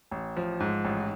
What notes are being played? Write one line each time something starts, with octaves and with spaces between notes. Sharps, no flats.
A1
F3
G#2
A1